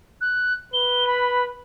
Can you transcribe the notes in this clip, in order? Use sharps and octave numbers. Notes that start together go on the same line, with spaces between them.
F#6
B4 G7
B5